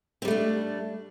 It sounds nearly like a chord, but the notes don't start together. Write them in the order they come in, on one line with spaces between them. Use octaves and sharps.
C4 G3 A3 D4